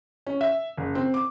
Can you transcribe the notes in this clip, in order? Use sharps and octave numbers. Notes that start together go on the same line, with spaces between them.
C#4
E5
F#1
C4
D6